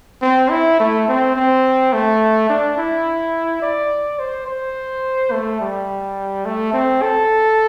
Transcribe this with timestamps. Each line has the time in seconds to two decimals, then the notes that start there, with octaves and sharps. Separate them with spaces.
0.22 C4
0.50 E4
0.80 A3
1.08 C4
1.36 C4
1.93 A3
2.49 D4
2.77 E4
3.62 D5
4.19 C5
4.46 C5
5.31 A3
5.61 G3
6.45 A3
6.73 C4
7.02 A4